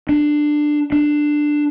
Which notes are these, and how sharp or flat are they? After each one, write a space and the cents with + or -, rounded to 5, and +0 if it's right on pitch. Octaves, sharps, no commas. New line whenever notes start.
D4 +15
D4 +10